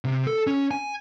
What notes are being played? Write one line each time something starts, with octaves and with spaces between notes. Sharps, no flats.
C3
A4
C#4
G#5